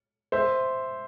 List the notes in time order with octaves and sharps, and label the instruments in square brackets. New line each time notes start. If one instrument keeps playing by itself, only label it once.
[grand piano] C5 E5